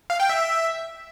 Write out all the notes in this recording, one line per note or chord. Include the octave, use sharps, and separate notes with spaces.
F5
G5
E5